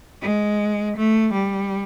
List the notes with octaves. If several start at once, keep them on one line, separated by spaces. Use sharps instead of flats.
G#3
A3
G3